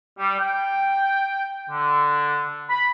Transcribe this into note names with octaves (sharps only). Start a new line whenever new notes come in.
G3
G5
D3
B5